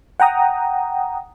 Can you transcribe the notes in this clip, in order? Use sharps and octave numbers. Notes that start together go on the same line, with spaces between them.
F#5 G5 A#5 D#6